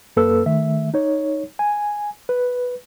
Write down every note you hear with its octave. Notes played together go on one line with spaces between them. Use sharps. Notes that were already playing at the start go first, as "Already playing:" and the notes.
F#2 A#3 A4 B4 E6
D#3 A3 E5
D#4 C#5
G#5
B4